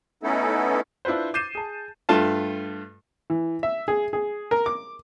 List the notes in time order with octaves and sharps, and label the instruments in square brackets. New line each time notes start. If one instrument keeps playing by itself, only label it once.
[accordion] A3 B3 C#4 D#4 E4 A4
[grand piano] D4 E4 F4 B4 C5
D6 G6 A6 C7 D#7 E7
G#4 A5
[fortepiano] G2 A3 F4 A5
E3
E5
G#4
G#4
A#4
D6